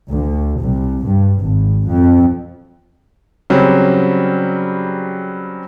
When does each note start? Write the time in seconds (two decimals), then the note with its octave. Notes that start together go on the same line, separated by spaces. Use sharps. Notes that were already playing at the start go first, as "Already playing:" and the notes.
0.12 D2
0.61 C2
1.05 G2
1.42 G#1
1.88 F2
3.50 C#3 F#3 G3 C4